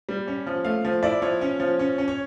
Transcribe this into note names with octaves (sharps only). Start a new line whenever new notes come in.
G3
C#4
F3
A3 F5
F3
E4 D5
F3 C#5
C#4
F3
C#4
C#4
C#5